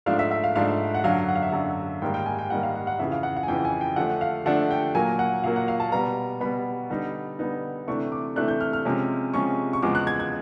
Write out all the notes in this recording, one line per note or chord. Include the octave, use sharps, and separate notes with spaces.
G#2 F3 A3 D4 F5
E5
E5
F5
G#2 F3 A3 D4 F5
F#5
F#2 D3 F#3 F5
F#5
F5
E5
F#2 D3 F#3 F5
G#2 D#3 G3 A#3 G5
G5
G#5
G5
G#2 D#3 G3 A#3 F#5
F5
F#5
F#5
F2 C#3 E3 E5
F5
F#5
F#5
G#5
F2 C#3 E3 G5
G#5
G5
D3 F3 A3 D4 F#5
F5
D3 F3 A3 D4 F#5
G5
A#2 F#3 A#3 G#5
F#5
A#2 F#3 A#3 F5
F#5
F5
A5
B2 G3 B3 A#5
B2 G3 B3 B5
D3 G3 B3 D#4
D3 G3 B3 D#4
C3 E3 A3 D4 C#6
D6
C3 E3 A3 D4 F#6
G6
F6
F6
C3 F3 G#3 C#4
C3 F3 G#3 C#4 C#6
C#6
E2 C#3 F3 G#3 D6
F#6
G#6
G#6